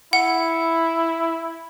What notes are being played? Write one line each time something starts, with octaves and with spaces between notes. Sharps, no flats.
E4 F#5